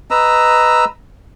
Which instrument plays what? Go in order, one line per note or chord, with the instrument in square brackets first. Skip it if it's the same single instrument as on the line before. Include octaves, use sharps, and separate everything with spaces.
[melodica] B4 D#5 A#5 E6